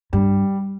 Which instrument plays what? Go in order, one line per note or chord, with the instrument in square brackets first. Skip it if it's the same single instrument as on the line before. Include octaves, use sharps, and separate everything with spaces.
[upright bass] G2 [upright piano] G3